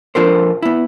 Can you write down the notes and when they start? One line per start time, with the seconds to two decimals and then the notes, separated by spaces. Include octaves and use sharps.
0.15 F3 D4 F4 A4 A#4 C5
0.62 B3 E4